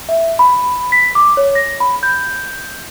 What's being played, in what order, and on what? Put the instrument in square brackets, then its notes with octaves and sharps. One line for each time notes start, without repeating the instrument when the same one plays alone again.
[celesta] E5
B5
B6
D6
C#5
A#6
B5
G6